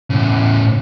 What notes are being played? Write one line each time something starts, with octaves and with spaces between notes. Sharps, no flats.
A2 C#3